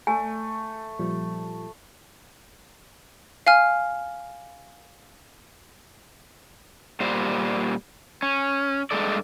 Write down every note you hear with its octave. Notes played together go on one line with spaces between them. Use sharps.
A3 G#5
A#2 F3 G3
F5 G#5 F6
A#2 G3 C5
C#4
G2 G#3 A4 D5